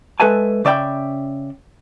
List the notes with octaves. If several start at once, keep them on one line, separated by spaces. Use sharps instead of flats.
G#3 A4 B4 E5 G#5 A5
C#3 D5 E5 G5 B5